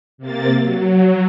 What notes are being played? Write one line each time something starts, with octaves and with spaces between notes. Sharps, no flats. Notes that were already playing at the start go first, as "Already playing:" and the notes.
C3 A#3 A6
F#3